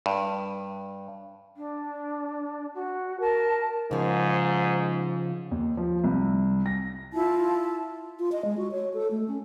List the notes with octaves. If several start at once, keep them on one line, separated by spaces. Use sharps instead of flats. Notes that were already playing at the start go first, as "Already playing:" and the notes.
G2
D4
F#4
A#4 A5
G#2 C#3 F3
D#2
F3
C2
A#6
E4 F4 A5
F4
D#5
G#3
F#4
C#5
A4
A3
C#4